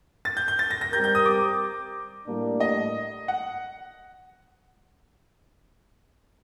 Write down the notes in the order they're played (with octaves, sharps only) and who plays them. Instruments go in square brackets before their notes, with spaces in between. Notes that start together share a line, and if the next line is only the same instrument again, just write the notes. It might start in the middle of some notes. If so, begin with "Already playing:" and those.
[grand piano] A6
G6
G6
A6
A#6
A#6
[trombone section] G3 C4 G4 A#4 [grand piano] G6
[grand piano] G6
D#6
D6
[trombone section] A2 G3 A#3 D4
[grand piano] D#5
F#5